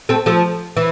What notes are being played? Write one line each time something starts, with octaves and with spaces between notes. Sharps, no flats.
A3 C4
F3 A3
E3